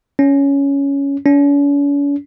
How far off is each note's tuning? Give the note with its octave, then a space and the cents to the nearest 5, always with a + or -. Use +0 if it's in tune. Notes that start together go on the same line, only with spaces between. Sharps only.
C#4 +10
C#4 +45